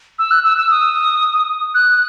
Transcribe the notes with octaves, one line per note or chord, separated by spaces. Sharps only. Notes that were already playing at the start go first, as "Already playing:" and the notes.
E6
F#6
E6
E6
D#6
F#6